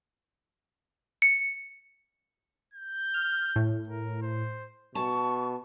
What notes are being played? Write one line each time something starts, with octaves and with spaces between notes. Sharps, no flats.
C#7
G6
F6
A2
A#4
C5
B2 A5 C#6